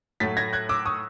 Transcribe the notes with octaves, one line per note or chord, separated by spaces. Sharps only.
A2 F#3 A3 A6 B6
G#6 A#6
F#6 G#6
D6 E6
C#6 D#6